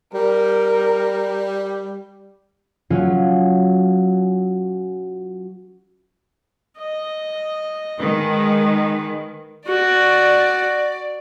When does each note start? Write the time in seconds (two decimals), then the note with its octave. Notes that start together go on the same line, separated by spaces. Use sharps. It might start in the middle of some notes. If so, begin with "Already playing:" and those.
0.14 G3 A#4
2.90 F#3 C#4 F4
6.77 D#5
8.01 D#3 G#3 B4
9.68 F#4 D5